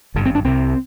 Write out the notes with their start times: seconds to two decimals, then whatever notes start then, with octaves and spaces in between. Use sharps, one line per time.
0.15 G#1 G2 D3
0.26 C4
0.35 D4
0.44 C2 C3 C4